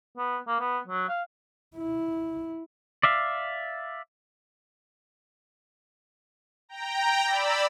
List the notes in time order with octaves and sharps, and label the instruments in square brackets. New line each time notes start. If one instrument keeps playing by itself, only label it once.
[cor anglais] B3
A#3
B3
F#3
F5
[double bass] E4
[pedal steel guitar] D5 E5 F5
[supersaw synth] G5 A#5
D5 B5 E6